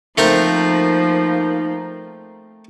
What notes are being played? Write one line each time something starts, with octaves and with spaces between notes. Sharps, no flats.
F3 A3 A#3 C4 D#4 A#4